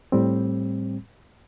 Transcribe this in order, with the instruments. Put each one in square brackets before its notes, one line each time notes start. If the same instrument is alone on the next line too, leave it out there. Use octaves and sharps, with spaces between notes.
[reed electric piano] A2 G3 C4